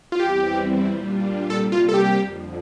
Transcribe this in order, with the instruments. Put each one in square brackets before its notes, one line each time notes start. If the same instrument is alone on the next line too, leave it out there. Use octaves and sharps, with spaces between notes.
[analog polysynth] F4
[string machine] E2 E3 G3 C4 E4 [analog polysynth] G4
[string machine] A#2 G3 D4 F4
[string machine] C3 G3 A#3 [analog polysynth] A4
[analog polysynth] F4
A4
G4
[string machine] F2 D3 F3